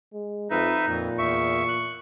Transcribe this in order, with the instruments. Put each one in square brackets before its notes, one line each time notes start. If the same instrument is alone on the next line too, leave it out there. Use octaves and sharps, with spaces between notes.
[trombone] G#3
[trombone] F2 [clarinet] D#4 [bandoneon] B4 E5
[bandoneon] F2 [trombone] A#2
[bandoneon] E2 E5 [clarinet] C#6
[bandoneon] F#6